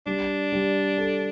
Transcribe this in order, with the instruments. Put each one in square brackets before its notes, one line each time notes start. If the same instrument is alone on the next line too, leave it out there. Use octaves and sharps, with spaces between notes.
[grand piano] G3 [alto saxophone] D4
[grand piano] G3
A4